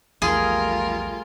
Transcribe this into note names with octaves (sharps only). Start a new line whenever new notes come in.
A#1 E2 G3 A3 F4 G#4 A#4